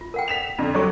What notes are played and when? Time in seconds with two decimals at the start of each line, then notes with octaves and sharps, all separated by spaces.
0.01 F4
0.14 A#4 F#5 G5
0.28 B6 E7 F7
0.59 F2 D3 F4
0.75 F#3 G4 A4 C#6